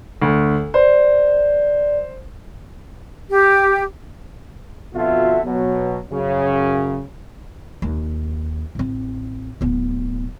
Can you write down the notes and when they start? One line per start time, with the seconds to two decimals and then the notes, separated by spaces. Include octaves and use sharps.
0.22 D2
0.74 C5 D5
3.30 G4
4.95 F2 B2 D3 F4 F#4 E5
5.44 B2 F#3
6.11 F#2 C#3
7.82 D#2
8.75 A1 C4
9.61 D1 B3